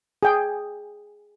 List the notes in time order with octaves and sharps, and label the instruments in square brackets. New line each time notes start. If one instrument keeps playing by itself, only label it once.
[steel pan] G#4 G5